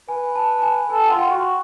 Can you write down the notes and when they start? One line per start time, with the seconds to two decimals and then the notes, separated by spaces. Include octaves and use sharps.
0.09 B4 G#5
0.36 A5
0.59 A5
0.62 G#5
0.90 A4 G#5
1.00 G5
1.09 F4 F#5
1.19 G5
1.31 F#4